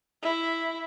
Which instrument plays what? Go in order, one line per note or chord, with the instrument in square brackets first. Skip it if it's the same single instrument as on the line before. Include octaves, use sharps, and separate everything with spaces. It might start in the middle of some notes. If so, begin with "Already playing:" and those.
[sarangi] E4